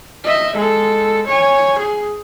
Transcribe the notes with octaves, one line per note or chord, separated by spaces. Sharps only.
D#5 E5
G#3 A4
C#5 G#5
G#4